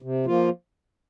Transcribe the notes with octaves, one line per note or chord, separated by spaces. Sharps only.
C3
F3 A#3 F4